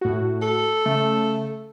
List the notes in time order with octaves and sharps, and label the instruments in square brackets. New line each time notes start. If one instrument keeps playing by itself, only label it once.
[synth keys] A2 F#4
[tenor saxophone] A4
[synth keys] C#3 A3